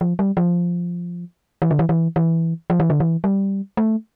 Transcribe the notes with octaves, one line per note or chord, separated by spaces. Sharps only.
F3
G3
F3
E3
D3
E3
E3
E3
F3
E3
D3
E3
G3
A3